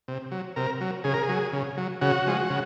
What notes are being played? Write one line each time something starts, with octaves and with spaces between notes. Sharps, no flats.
C3
F#3
C3 A#4
F#3
C#3 G#4
A#4
G#4
F#3
C#3
F#3
C#3 F#4
F3 G#3
C#3